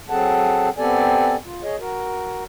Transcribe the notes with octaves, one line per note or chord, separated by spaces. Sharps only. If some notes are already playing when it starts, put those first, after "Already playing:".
F#3 C4 G#4 A4 F#5 A5
B3 C4 G4 A4 D5 G#5
F4
G#4 C#5 D#5
F#4 A#4